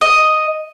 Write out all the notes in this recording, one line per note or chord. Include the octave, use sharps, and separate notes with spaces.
D#5